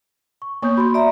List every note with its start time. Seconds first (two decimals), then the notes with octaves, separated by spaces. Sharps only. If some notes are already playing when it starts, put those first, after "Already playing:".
0.42 C#6
0.62 A#3 B3 C#5 C#6 D#6 G6
0.77 F#4 B5 C6
0.94 D5 E5 A#5